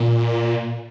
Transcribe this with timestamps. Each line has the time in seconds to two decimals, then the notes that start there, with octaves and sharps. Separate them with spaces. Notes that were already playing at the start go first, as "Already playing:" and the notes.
Already playing: A#2